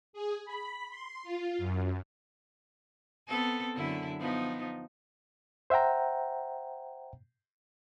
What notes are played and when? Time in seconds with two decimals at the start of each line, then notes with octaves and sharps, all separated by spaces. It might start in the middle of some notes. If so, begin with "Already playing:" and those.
0.13 G#4
0.45 B5
0.90 C6
1.23 F4
1.58 F#2
3.28 B3 C4 A4
3.75 F#2 D3 E4
4.20 F3 B3 D#4
5.70 C5 E5 F#5 G5 A#5